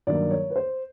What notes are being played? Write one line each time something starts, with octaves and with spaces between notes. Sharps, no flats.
G2 D#3 F#3 A#3 D5
C#5
B4
C5